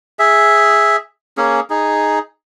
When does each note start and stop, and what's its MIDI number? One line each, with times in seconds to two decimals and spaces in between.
0.19 0.96 68
0.19 0.96 76
1.37 1.60 58
1.37 1.60 61
1.37 1.60 68
1.70 2.19 63
1.70 2.19 68